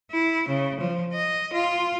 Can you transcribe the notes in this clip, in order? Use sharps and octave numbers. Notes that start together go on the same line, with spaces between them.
E4
C#3
F3
D#5
F4